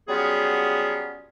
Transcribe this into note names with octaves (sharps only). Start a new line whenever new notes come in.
F#3 G3 B3 C#4 F4 G#4